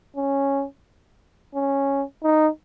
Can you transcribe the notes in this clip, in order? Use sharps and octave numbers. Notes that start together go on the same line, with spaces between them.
C#4
C#4
D#4